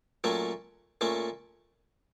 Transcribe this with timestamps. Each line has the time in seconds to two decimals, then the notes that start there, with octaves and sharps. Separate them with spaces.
0.24 A#2 F#3 A3 C#4
1.01 A#2 A3 C#4